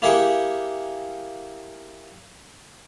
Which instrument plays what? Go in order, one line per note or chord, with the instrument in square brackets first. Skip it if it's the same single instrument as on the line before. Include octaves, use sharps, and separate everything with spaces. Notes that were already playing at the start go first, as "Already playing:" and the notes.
[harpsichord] A#3 E4 G4 G#4 F#5 G5